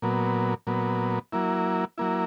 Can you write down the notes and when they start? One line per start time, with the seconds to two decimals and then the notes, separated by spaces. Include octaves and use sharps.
0.02 A#2 F#3 B3
0.67 A#2 F#3 B3
1.32 F#3 A#3 E4
1.98 F#3 A#3 E4